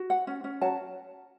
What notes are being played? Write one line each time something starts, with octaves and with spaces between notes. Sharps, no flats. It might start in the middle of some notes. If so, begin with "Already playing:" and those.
Already playing: F#4
F#5
C#4
C#4
F#3 A5